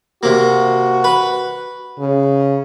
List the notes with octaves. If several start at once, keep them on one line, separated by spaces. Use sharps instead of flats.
C3 A#3 F#4
B4
C#3